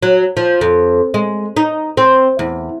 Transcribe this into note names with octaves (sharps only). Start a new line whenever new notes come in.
F#3
F3
F2
G#3
D#4
C4
E2